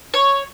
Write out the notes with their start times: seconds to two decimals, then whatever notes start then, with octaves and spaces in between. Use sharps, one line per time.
0.14 C#5